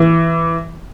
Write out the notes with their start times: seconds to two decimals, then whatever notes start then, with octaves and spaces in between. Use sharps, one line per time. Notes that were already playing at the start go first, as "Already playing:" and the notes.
Already playing: E3